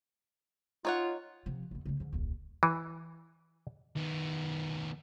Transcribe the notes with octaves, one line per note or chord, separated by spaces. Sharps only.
D#4 F4 C#5 F#5
C3 F3
E2 B2
C#3 G#3
G#2 D3
D#1 C2
E3
D#3 B3